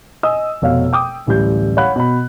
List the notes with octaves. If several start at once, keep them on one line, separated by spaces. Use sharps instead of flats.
D#5 G#5 D#6 E6
F1 B2 C#5 F5
G5 D6 D#6
D1 A1 G3 G6
C#5 F5 F#5 B5 F#6
B2 B5